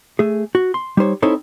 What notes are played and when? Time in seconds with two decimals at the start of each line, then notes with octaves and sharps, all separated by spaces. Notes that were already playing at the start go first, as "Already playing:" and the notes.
0.19 A3 G#4
0.55 F#4
0.74 C6
0.97 G3 D#4 C5 C#5
1.22 C4 D#4 E4 A4 C5 C#5